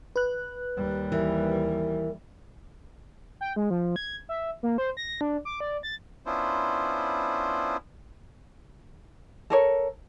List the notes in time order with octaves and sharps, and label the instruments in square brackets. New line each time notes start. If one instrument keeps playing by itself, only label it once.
[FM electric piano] B4 F#6
[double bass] D#2 G3
[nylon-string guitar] E3 [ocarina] A#4
[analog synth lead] G5
G#3
F3
G#6
E5
A#3
C5
A#6
D4
D6
D5
A6
[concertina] B3 C#4 D4 E4 F4 C5
[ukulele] A4 A#4 C#5